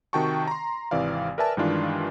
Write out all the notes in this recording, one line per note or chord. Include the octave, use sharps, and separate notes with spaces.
C3 D#3 F#4 G5 A5 C#6
A#5 C6
G#1 C3 E3 D5 F5
A#4 B4 D5 E5 G#5 A5
G2 D#3 E3 G#3 D4 F4